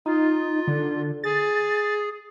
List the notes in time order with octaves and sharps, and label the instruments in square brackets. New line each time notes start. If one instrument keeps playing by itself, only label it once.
[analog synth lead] D#4 [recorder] F4
[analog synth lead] D3
[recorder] G#4 [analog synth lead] A6